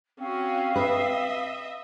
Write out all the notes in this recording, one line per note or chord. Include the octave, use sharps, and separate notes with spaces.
C4 C#4 F#4 F5
B4 D#5 E5